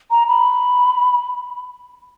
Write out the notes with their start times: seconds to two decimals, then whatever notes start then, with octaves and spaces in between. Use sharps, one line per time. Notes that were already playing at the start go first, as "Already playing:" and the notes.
0.11 A#5
0.28 B5